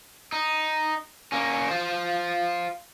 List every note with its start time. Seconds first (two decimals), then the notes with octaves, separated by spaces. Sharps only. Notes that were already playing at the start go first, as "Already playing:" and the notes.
0.32 D#4
1.32 A#3 C#4
1.68 F4 C5